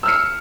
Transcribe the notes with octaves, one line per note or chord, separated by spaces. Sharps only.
E6 F6 C#7